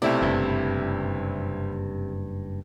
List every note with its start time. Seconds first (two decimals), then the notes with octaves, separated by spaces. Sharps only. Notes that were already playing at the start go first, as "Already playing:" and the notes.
0.02 B1 C3 A3 E4 D5
0.22 F#1 G2